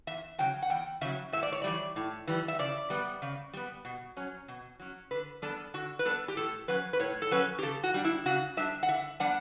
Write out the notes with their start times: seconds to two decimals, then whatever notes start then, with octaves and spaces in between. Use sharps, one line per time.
0.07 E2 E5
0.39 C#3 F#3 G5
0.62 F#5
0.70 E2 G5
1.01 C#3 F#3 E5
1.33 A2 E5
1.43 D5
1.52 C#5
1.62 E3 G3 D5
1.96 A2
2.27 E3 G3
2.48 E5
2.59 C#3 D5
2.90 G3 B3
3.22 C#3
3.53 G3 B3
3.85 B2
4.17 F#3 C#4
4.48 B2
4.80 F#3 C#4
5.11 D3 B4
5.42 G3 B3 D4 A4
5.74 D3 F#4
5.99 B4
6.05 G3 B3 D4 A4
6.28 G4
6.37 A2 A4
6.68 F#3 C#4 B4
6.93 B4
7.00 A2 C#5
7.22 A4
7.31 F#3 C#4 B4
7.59 G4
7.63 C#3 A4
7.84 F#4
7.94 G3 D4
8.05 E4
8.26 C#3 F#4
8.57 G3 D4 E5
8.83 F#5
8.89 D3 E5
9.20 G3 B3 D4 F#5